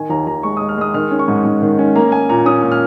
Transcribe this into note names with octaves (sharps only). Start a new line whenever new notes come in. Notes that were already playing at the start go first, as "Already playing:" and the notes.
Already playing: D#3 G#5
D#2 A#5
D#2 A#5
G#3 C#6
G#3 D#6
F6
G#3 D#6
D#3 F6
C#4
C#6
G#2
G#2
D#3
C#4
A#3 A#5
A#3 G#5
A#2 A#5
C#4 D#6
A#2
F6